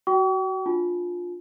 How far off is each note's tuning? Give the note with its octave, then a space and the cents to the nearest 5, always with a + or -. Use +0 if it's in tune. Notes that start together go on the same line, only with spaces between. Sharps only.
F#4 +20 G5 -35 C#6 +45
D4 +0 F4 +15 G#5 +45